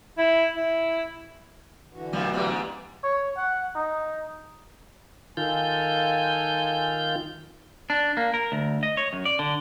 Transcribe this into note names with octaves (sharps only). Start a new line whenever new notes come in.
E4
E4
D3 E3 F#4
B1 G2 A#2 F3 F#3 A3
E2 G#2 G3
C#5
F#5
D#4
D#3 F4 A4 G#5 G6
D4
A#3
A#4
D2
D#5
C#5
F#2
D5
D3